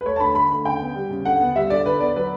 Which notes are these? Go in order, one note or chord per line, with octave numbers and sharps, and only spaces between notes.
B4
A3 C#5
A5
D3 B5
A3 B5
D3
C#3 G5
B3
G3
C#3
D3 F#5
B3
G3 E5
D3 D5
D3 B4
B3 D5
F#3 B4